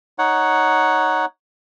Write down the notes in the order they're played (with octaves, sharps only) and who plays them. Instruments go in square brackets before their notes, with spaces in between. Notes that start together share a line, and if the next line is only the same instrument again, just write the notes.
[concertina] D#4 C#5 F#5